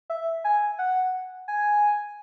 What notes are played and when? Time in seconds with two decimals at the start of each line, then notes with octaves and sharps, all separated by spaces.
0.10 E5
0.44 G#5
0.79 F#5
1.48 G#5